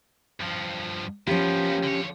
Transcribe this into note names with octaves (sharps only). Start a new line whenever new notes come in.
G2 F3
F3 A#3 B3 C#4 G4
D3 C#5